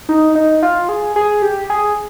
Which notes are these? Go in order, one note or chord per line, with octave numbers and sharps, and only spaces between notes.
D#4
D#4
F4
G#4
G#4
G4
G#4